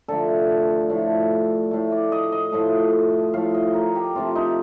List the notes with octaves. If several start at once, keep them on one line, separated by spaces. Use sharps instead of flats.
D3 F3 A3 A4
A2 F3 A3
A2 A3
D5
D#5
D#5
A2 F3 A3
A2 F3 A3 F5
D#5
A#4
G4
C3 F3 A3 F4
D#4